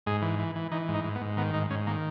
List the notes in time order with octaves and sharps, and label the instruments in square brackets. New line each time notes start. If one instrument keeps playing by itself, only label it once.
[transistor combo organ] G#2 G#4
E3
E3
E3
E3 D#4
G#2
D#4
G#2
B3
G#2
D#3 B3
G#2 D#4
G#2 C#4
D#3 A#3